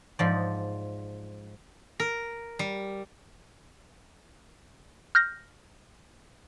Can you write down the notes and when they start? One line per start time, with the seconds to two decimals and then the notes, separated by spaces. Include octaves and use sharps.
0.19 G#2 F3 D5
2.00 A#4
2.59 G3
5.15 F6 G6 A#6